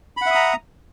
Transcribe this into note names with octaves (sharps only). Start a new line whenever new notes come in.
E5 F#5 A#5 B5 D#6